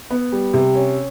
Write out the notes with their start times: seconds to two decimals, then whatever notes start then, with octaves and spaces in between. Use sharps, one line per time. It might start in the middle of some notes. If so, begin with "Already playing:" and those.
0.11 B3
0.32 G3
0.54 C3
0.75 C#4